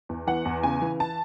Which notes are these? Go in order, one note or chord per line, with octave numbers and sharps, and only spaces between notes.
E2
E3 F#5
E2
C#3 G#5
E3
A5